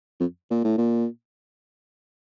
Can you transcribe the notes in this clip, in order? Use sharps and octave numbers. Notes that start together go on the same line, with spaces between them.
F2
A#2
A2
A#2